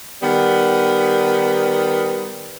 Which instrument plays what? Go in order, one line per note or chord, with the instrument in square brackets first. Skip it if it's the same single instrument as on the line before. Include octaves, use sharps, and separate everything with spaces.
[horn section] D#3 G3 B3